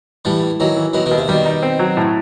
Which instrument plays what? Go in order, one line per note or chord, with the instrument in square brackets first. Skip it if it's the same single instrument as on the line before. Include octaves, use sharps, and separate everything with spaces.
[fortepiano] A2 [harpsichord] E3 G3
[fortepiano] A2
[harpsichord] D#3 F#3 [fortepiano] E3
[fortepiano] E3
[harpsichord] D#3 F#3 [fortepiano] B3
[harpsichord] B2 D#3
[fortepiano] D#2
[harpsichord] C3
[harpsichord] B2 D#3 [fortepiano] G3
[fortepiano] D#4
C4
F#3
A2